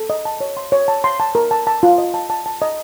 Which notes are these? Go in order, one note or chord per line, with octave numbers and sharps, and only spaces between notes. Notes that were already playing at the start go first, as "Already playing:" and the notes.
Already playing: A4
D#5
A5
C#5
C6
C#5
A5
C6
A5
A#4
A5
A5
F4
D#5
A5
A5
A5
D#5